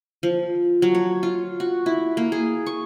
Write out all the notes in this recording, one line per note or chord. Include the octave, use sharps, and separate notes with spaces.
F3
F#3
C#5
F4
F#4
E4
A#3
G#4
C#6